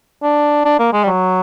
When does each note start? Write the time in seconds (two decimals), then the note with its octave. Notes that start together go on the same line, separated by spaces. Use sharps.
0.23 D4
0.65 D4
0.80 A#3
0.93 G#3
1.04 G3
1.07 F#3